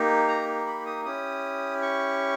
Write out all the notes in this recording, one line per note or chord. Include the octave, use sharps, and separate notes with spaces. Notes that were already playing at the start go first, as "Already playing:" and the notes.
Already playing: A#3 D#4 G4
A#5
B5
D#6
C#4 E4 G4 D#6
C#6